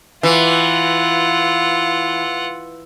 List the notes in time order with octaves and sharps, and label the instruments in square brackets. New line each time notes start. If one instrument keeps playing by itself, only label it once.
[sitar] E3 [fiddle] F4 F#5